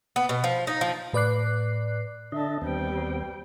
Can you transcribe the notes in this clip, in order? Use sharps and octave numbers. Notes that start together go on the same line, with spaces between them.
B3
B2
F3
D#4
F3
A2 B4 D5 D6 F#6 C7
D3 D4 D#5 E5 A5
D#2 G3 B3 C4 G5